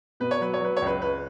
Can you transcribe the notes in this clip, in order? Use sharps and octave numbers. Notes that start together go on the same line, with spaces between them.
B2 B4
C#5
F#3 B4
C#5
F#3 B4
C#5
C#2 B4
C#2 B4